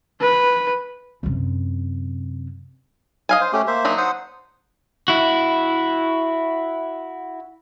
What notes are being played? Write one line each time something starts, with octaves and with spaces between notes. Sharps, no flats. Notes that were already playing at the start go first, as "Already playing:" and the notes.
B4
F#2 C3
D#5 F5 G#5
C5
A3 C#4 G4
A#3 C5 E5
F#3 D4 D#4
C5 F#5 D#6
E4 F#4